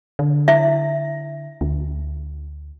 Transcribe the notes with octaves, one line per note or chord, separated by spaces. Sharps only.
D3
E4 E5
D2